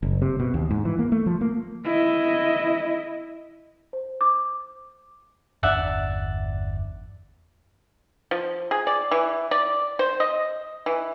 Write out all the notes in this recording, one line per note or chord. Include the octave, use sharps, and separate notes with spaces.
F#1
C3
B2
D#2
G#2
E3
A#3
A3
F3
A#3
E4 D#5
C5
D6
G1 E2 D4 D5 E5 F#5
F3
G#4
D5
E3
D5
C5
D#5
E3